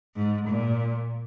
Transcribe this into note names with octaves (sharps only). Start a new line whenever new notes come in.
G#2
A#2